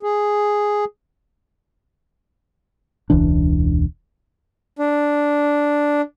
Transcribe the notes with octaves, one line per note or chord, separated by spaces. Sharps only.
G#4
E1 C#2 E3 D4
D4